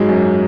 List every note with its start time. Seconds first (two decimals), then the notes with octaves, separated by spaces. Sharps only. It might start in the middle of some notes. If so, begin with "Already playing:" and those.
Already playing: G#2 F#3 G#3
0.09 F#2